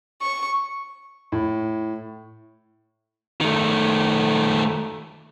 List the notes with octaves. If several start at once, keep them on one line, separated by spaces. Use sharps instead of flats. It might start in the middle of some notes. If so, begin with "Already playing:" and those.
C#6
A2
D#3 A3